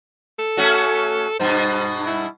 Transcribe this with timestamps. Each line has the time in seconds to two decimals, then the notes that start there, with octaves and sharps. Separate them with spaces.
0.39 A4
0.57 A3 C#4 F#4
1.40 G2 B2 C5
2.07 E4